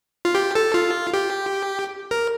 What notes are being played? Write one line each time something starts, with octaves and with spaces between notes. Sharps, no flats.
F4
G4
A4
F4
G4
A#4